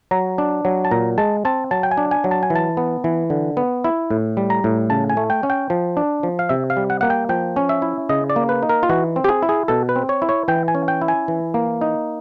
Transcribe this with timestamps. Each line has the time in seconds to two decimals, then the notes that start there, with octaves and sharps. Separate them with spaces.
0.11 F#3 A#5
0.38 D4
0.65 F#3
0.85 A5
0.91 A#2 A#5
1.18 G#3 A5
1.45 C4 A5
1.71 F#3 A5
1.83 G5
1.91 G#5
1.98 D4
2.11 G#5
2.24 F#3
2.31 A5
2.43 G#5
2.50 E3
2.55 A5
2.77 B3
3.04 E3
3.30 D3
3.57 B3
3.84 E4
4.11 A2
4.37 G3
4.50 A#5
4.64 A2
4.90 C#3 A5
5.10 G#5
5.17 A3
5.30 G5
5.43 C#4
5.50 G5
5.70 F3
5.97 D4
6.23 F3
6.39 F5
6.49 C3 E5
6.70 F5
6.77 G3
6.90 F#5
7.01 A#3 F#5
7.10 G5
7.29 F3 G5
7.56 C#4
7.69 E5
7.82 E4
8.09 C#3 D#5
8.30 D5
8.36 A#3
8.49 B4
8.63 D#4
8.69 A#4
8.83 F4
8.89 E3 F#4
9.16 C4
9.24 G4
9.28 G#4
9.42 E4
9.49 G#4
9.68 B2 A4
9.89 B4
9.96 C4
10.09 C#5
10.22 E4
10.29 C#5
10.48 E3 G5
10.68 G#5
10.75 C#4
10.88 G5
11.01 E4
11.08 G#5
11.28 E3
11.54 A#3
11.81 D#4